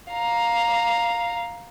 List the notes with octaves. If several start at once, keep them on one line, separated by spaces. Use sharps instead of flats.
F5 A#5